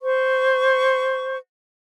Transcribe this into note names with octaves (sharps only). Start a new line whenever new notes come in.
C5 C#6